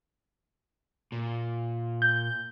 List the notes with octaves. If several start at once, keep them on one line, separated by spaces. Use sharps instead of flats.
A#2
G6